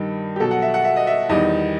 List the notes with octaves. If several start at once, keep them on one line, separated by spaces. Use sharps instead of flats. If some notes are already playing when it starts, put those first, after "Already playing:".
Already playing: G2 D#3 G3
G4
B2 F#3 A4
F#5
E5
F#5
E5
D#5
E5
E2 D#3 G3 D#5